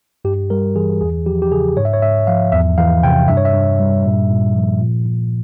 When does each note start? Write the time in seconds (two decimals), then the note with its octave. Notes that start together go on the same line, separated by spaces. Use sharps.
0.25 G2 G4
0.50 G3 A#4
0.76 E3 G#4
1.01 E2 G#4
1.26 F3 G4
1.42 G4
1.52 C#3 G#4
1.77 G#2 C#5
1.85 E5
1.93 C#5
2.02 G#2 E5
2.27 F3 F5
2.52 E2 E5
2.78 E3 F5
3.03 C3 G5
3.28 G2 E5
3.37 C#5
3.45 E5
3.54 G2
3.80 G3
4.05 A#2
4.30 A#2
4.56 F3
4.81 A#2
5.06 A#2